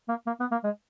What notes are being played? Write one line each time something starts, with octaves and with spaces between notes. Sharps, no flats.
A#3
A#3
B3
A#3
G#3